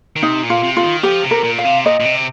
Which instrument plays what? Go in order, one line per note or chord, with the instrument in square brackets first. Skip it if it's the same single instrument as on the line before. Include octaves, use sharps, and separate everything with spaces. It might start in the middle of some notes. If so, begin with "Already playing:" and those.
[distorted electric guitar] D#3
[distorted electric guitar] C3 [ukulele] D#4
[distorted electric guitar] A#2
[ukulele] F4
[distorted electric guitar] C3
[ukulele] F4
[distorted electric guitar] D#3
[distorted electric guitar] F3 [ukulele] G4
[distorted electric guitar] C3
[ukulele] A#4
[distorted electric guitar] A#2
[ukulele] F5
[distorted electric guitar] C3
[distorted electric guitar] A#2 [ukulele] D#5
[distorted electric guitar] A#2
C3